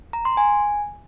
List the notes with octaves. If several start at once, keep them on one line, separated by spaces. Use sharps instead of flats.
A#5
C6
G#5